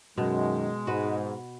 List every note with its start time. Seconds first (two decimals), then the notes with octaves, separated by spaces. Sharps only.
0.18 F#2 B2 D#3 G#3
0.87 G#2 F#4 B4